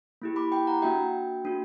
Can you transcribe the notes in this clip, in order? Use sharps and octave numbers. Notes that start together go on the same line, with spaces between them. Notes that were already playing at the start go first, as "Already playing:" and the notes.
A#3 E4 G4
B5 D6
G5 B5
F#5 A#5
A#3 D4 F#4 E5 G5
A#3 D4 F#4